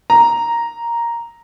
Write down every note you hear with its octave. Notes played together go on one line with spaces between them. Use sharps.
A#5